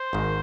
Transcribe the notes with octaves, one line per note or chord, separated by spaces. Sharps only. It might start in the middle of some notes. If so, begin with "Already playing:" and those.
Already playing: C5
G#1 G#2 D#3